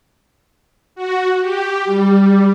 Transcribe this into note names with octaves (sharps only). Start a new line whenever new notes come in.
F#4
G4
G3